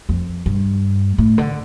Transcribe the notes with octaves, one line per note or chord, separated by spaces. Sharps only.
F2
G2
A2
D3